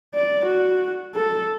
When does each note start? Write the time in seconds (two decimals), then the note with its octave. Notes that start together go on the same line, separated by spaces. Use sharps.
0.14 D5
0.45 F#4
1.15 A4